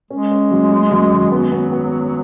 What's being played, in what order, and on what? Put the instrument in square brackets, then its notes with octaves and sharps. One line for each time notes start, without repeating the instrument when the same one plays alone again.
[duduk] G#3 [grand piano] C#4
[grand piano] C#4
F#2
F#2
F#2
G#1
[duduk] F#3 [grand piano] B3
[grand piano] B3
B3